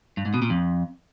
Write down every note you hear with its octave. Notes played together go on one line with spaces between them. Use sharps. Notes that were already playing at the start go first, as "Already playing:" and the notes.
G2
G#2
B2
A#2
F2